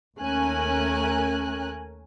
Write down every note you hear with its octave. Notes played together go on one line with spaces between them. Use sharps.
D#2 A3 C#4 A#4 G#5 F#6